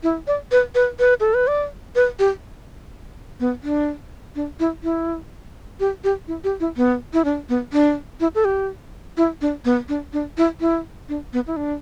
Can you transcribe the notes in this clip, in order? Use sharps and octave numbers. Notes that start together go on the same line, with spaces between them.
E4
D5
B4
B4
B4
A4
B4
D5
B4
G4
B3
D4
D4
E4
E4
G4
G4
E4
G4
E4
B3
E4
D4
B3
D4
E4
A4
G4
E4
D4
B3
D4
D4
E4
E4
D4
B3
E4
D4